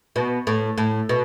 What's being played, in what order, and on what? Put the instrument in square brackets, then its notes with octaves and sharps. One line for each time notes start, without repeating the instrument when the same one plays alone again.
[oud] B2
A2
A2
B2